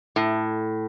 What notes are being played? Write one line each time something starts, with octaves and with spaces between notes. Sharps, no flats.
A2